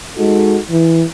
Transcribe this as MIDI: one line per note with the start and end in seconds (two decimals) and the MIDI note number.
0.17 0.59 56
0.17 0.59 63
0.17 0.59 66
0.17 0.59 69
0.70 1.04 52